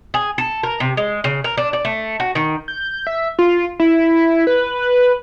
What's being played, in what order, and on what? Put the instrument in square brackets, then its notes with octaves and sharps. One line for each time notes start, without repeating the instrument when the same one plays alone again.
[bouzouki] G#4
A4
A#4
C3
G#3
C#3
A#4
D4
D5
A3
F#4
D#3
[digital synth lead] G6
E5
F4
E4
B4